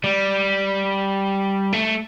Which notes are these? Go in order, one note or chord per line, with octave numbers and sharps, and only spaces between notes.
G3
A3